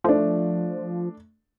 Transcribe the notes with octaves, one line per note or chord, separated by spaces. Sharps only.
F3 A3 D4